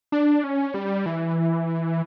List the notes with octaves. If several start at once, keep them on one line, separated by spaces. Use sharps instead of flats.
D4
C#4
G3
E3